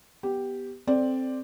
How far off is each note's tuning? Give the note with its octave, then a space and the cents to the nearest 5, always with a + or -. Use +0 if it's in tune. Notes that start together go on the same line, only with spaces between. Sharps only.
B3 +0 G4 +0
C4 +0 A4 +0 D5 +0